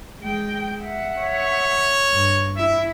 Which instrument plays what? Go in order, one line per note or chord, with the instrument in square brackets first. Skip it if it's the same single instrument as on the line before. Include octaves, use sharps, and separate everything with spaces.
[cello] G#3 G5
E5 F#5
[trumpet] C#5
[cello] G2
[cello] E4 [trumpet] E5